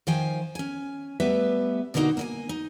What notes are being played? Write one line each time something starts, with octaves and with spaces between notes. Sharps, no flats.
D#3 F3 C5 F5 G5 G#5
C#4 G#5
G3 A3 B3 G4 B4 E5
B2 D3 G3 A#3 D#4 F#4
A#3 D#5 G#5
D#4